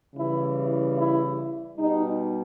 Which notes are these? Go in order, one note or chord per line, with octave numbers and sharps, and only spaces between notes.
C#3 E3 G3 E4
E4
B2 G3 D#4